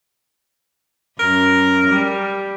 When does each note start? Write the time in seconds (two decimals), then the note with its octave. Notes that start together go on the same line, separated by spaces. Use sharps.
1.19 F#2 A#4
1.87 G3